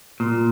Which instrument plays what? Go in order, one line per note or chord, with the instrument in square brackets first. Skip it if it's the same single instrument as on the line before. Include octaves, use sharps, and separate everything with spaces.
[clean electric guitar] A#2